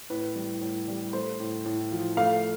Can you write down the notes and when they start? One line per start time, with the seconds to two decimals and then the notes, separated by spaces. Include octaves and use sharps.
0.10 A2 B4
0.36 G3
0.61 A2
0.88 G3
1.13 A3 C5
1.40 A2
1.66 A2
1.92 F3
2.17 A3 F5